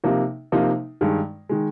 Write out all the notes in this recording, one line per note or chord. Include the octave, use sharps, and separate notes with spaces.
C3 F3 A#3 D#4
C3 F3 A#3 D#4
G2 D#3 G#3
D#3 G#3